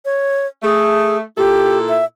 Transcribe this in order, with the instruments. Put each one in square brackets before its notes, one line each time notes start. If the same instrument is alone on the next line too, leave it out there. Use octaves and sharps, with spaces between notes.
[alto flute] C#5
[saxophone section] A3 [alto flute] G#4
[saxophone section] A#2 E4 A4 [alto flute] G4
[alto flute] E5